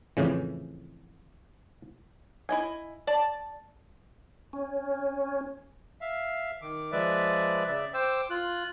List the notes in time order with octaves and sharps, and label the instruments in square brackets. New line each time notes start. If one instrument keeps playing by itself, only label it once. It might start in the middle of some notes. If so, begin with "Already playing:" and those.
[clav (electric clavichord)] F2 A2 C#3 E3
[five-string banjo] E4 D#5 G#5
[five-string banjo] D5 [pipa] A5
[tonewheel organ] C#4
[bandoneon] E5 F5
D#3 D6
F3 G#3 B4 D5 E5
C#3 D5 E5
C5 G5 D6 E6
F4 F#6